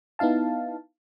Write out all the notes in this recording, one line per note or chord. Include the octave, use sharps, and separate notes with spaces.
B3 D#4 E4 F5 A5